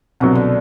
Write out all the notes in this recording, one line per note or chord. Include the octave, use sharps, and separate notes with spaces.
C2 B2 D3 F#3
D3